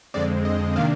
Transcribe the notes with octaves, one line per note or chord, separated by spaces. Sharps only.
F2 D3 G#3 C4 D5
D#5
C3 D#3 A#3 D4 F5